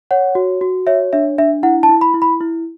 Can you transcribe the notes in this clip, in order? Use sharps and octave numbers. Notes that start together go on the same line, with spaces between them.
C#5 F#5
F#4
F#4
C#5 E5
D4 E5
D4 E5
E4 F#5
A5
E4
B5
E4
B5
E4